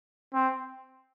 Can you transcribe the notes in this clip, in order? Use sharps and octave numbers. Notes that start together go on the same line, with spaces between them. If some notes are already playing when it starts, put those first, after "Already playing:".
C4